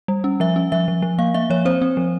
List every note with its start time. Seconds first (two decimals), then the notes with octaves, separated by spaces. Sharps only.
0.08 G3
0.24 C#4
0.40 F3 E5
0.56 C#4
0.72 F3 E5
0.88 F3
1.02 F3
1.19 A#3 F5
1.34 A#3 E5
1.50 F3 C#5
1.65 C4 C5
1.82 C4
1.97 F3